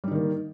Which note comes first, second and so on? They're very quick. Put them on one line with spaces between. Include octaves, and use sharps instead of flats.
G3 D#4 D#3 A#3